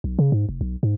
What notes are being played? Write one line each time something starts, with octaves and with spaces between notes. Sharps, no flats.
B1
C#3
G#2
F1
B1
G#2